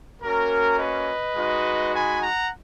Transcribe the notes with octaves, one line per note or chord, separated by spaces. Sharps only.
A#3 C#4 F#4 A#4
B4 D#5
G#3 D#4 F#4
G#5 B5
F#5 A#5